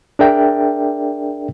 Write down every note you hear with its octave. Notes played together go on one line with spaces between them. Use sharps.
D4 G#4 A#4 D5 E5 G5